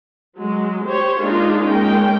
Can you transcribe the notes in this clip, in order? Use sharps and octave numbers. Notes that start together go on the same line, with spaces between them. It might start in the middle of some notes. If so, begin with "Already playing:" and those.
F#3 G#3
G4 C5 C#5
G#3 A#3 D4 D#4 F4 G#4
G#3 A#3 C#4 G5